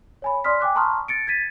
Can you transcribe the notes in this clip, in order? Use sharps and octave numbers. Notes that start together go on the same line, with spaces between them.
C#5 G#5 B5
D5 C6 D#6 F6 B6
G5 G#5 D6 F#6
A5 A#5 C6 C#6 D#6 F6
A6 C#7 D7
G#6 A6 B6 D#7